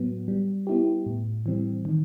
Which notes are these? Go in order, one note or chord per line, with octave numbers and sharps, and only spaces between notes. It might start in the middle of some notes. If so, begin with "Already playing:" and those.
Already playing: A2 F#3 B3
G3
B3 E4 G4
A2
E3 G3 C4
D#3